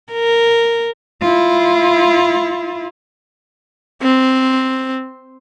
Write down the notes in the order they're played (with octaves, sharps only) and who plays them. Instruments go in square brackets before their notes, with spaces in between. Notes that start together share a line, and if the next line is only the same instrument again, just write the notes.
[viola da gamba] A#4
[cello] E4 F4
[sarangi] C4